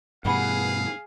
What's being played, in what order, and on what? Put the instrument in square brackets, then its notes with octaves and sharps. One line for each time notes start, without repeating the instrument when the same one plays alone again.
[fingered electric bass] G2 B2 G3 [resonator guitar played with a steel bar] E3 B4 F#5 [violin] G#4 [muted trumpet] F5